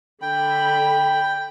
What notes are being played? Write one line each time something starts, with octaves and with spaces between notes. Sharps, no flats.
D3 G5 B5